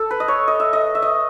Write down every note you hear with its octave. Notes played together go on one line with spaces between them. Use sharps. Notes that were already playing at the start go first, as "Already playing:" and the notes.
Already playing: A4
B4
D#5
C#5
D#5
E5
D#5
E5
D#5